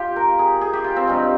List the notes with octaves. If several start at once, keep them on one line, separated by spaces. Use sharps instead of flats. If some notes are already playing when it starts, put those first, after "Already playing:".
Already playing: F4 G4
A#4
G#4
G#4
G4
F4
C4
G2 D#3 C#4